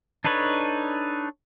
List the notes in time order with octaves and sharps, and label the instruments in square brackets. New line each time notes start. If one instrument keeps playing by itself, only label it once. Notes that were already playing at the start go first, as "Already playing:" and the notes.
[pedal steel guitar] D4 D#4 A4 B4 C#5